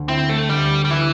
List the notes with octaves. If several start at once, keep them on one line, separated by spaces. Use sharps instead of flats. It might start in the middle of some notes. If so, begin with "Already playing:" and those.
Already playing: D2
C4 E4
A3
D2 G3
G3
E3 E4